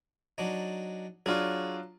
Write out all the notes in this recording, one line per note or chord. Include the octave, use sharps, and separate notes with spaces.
F#3 D4 D#4
F#3 D4 F4 G#4 C#5